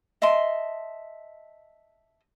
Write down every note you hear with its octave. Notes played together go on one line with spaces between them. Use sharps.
D#5 E5 A5 C6